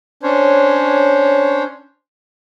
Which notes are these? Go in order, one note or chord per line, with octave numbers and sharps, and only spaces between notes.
C#4 D4 C5 C#5